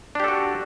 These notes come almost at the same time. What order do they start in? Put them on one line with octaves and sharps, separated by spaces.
D4 G4 A4 F#4